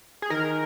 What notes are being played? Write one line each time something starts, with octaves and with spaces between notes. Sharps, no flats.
G#4
D#3 A#4